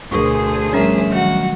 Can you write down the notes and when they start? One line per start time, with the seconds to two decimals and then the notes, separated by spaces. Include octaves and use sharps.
0.11 D2 B2 G#4 A#4 C5 C#6
0.73 F3 G3 A3 C#4 A#4 E5
1.12 D#3 F#3 F#4